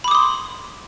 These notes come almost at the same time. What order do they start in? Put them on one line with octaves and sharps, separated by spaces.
B5 D6 D#6 C6